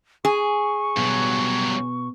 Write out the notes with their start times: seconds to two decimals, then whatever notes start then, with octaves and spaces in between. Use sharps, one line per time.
0.25 G#4 C#6
0.97 G2 B2 F#3